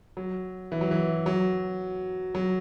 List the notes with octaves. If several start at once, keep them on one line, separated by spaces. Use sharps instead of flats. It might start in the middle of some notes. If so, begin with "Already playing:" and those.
F#3
E3
F#3
E3
F#3
F#3